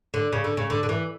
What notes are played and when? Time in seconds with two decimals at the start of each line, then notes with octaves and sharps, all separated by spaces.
0.14 D3
0.33 C#3
0.44 D3
0.57 C#3
0.70 D3
0.83 D3
0.89 E3